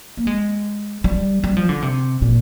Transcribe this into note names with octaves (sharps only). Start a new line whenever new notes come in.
A#3
G#3
G3
G3
F3
D3
C3
A#2